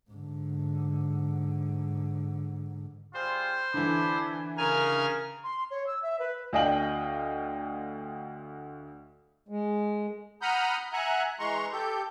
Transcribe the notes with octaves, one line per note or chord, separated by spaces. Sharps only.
G#2 D3
G3 F4 G#4 C5
D3 E3 A4 D5 B5
C#3 A#4 G#5 F6
C6
C#5
E6
E5
B4
D2 D5 D#5 F5 G5 F#7
G#3
F#5 A#5 B5 D#6 F6 G6
E5 F#5 G#5 A#5 F#6
E3 G#3 A#5 C6 C#6
G4 A4 G6